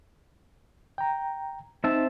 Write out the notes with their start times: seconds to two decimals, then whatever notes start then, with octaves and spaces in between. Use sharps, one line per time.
0.98 G5 A#5
1.84 C4 D#4 E5 A5